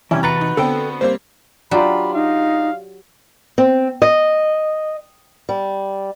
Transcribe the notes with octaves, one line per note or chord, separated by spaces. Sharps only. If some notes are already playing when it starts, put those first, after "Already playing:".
C3 E3 G3 C#4 E4
F#4 B4 A#5 A6 C#7
D#4
D3 B3 C4 A4 G5
G3 A#3 C4 C5
F#3 D4 F4 G4 B5
D#4 F5
C4
D#5
G3